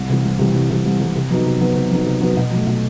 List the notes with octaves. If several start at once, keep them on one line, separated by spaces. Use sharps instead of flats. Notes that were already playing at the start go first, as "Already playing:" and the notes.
Already playing: C2
C3 E3 G3
C2
C3 E3 G3
C2
C3 E3 G3
C2
C3 E3 G3
C3
F#3 B3 D#4 F#4
C3
F#3 B3 D#4 F#4
C3
F#3 B3 D#4 F#4
C3
F#3 B3 D#4 F#4
B2
F#3 A3
B2